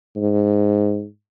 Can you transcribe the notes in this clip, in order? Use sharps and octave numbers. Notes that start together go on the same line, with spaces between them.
G#2